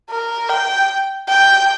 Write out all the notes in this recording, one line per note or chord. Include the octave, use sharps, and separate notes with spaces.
A#4
G5
G5